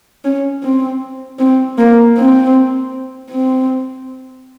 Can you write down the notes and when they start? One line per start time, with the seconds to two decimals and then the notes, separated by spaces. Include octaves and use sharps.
0.24 C#4
0.63 C4
1.39 C4
1.78 A#3
2.17 C4
3.31 C4